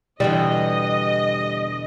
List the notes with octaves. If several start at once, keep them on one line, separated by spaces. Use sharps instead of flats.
E2 B2 D3 G3 D#5